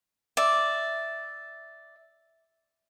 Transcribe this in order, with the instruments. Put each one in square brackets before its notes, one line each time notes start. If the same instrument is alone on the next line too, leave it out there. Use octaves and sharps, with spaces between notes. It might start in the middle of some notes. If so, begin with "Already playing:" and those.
[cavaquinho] D5 E5